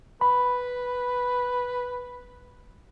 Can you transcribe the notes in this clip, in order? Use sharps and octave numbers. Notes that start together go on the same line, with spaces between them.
B4 B5